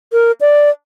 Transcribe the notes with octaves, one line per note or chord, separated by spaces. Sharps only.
A#4
D5